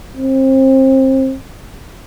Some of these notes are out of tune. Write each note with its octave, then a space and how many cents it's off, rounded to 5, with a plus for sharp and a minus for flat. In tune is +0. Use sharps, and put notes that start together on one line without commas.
C4 +25